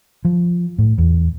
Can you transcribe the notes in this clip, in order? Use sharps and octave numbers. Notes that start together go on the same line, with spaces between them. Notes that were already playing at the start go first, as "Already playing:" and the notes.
F3
A2
E2